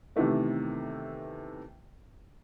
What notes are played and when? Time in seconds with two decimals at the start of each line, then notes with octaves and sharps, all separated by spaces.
0.16 C3 D#3 E3 A3 B3